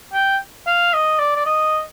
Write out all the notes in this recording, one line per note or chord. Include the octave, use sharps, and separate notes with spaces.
G5
F5
D#5
D5
D5
D#5